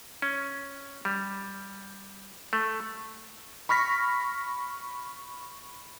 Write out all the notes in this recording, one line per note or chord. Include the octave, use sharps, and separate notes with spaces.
C#4
G3
A3
B5 C#6 F6 A#6 B6